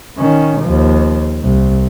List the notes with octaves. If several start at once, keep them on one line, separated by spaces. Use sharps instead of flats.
D#3 C#4
D#2 F3
C2